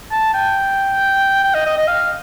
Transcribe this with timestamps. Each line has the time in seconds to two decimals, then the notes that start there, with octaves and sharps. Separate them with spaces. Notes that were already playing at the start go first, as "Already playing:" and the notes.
0.12 A5
0.34 G5
1.44 G5
1.55 D#5
1.66 D#5
1.77 D#5
1.88 F5